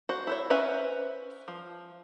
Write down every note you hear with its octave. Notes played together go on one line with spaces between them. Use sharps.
F#4 C5
E4 C5 C#5
C#4 B4 C5 E5 G#5
F3